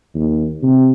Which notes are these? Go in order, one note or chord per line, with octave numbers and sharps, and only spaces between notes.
D#2
C3